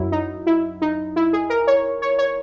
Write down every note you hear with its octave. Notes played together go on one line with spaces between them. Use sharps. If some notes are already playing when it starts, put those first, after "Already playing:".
Already playing: F#2 F#3 E4
D#4
E4
D#4
E4
G#4
A#4
C#5
C#5
C#5